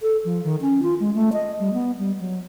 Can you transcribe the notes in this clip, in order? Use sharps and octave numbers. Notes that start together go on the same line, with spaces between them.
A4
F3
D#3
C#4
F4
G#3
A3
D#5
G3
B3
G3
F#3